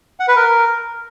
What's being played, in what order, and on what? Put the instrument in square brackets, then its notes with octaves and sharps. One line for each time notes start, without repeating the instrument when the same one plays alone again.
[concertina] F#5
B4
A#4